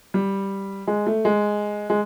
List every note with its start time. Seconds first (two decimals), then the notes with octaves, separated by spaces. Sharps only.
0.14 G3
0.87 G#3
1.07 A3
1.25 G#3
1.90 G#3